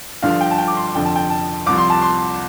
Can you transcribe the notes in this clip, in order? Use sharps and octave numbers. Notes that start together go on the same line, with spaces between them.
G1 G2 D3 F3 F5
G5
A5
G5
D6
C6
F1 F2 D3 F3 G5
A5
G5
A5
C2 C3 F3 D6
C6
A5
C6